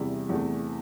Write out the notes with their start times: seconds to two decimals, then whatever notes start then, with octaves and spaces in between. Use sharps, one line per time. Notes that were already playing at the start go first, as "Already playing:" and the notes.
Already playing: E2 C3 G3 E4
0.29 E2 C3 E3 A3